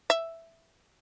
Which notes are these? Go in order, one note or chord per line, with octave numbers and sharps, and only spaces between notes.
E5